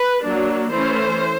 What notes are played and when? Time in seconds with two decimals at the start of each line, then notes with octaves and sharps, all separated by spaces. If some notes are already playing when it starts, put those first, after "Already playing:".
Already playing: B4
0.24 F#3 A#3 D4
0.72 E3 A3 C#4 C5